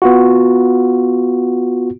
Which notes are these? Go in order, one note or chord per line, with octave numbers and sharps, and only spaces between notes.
B3 F4 F#4